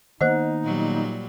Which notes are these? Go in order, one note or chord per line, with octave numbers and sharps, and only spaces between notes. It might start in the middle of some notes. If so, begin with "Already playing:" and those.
D#3 A#3 B3 D#4 C5 D#5 F#5
A#2 F#3 G3